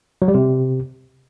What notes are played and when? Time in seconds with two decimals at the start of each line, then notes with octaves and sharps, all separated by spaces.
0.22 F#3
0.28 G3
0.34 C3